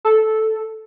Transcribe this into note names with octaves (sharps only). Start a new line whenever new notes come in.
A4